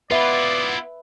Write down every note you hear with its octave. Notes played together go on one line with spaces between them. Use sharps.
B3 E4 F4 B4 D5 E5